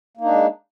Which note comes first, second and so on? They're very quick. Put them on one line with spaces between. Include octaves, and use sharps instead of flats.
A#3 D#4 D4 G#3